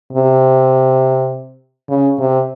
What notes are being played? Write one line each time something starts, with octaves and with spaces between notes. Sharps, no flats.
C3
C#3
C3